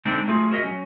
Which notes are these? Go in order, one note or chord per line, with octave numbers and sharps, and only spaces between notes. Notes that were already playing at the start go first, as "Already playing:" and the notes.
D3 G#3 A3 C4 D4 D#4
F#3 A3 F4 G#4
F#4 A#4 D#5 E5
F#3 C#4